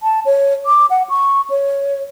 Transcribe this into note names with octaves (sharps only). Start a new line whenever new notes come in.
A5
C#5
D6
F#5
C#6
C#5